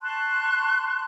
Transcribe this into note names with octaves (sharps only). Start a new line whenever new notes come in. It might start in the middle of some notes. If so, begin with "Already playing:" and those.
A5 C6 C#6 F#6